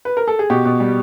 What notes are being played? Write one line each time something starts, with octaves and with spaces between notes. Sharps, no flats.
B4
A#4
A4
G#4
B2 G4
B2
G3